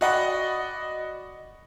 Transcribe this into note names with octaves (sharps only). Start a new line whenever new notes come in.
F#4 D5 D#5 F#5 B5